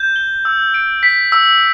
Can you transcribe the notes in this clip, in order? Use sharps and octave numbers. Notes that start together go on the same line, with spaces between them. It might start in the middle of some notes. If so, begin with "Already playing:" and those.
Already playing: G6
G7
E6
D7
B6
E6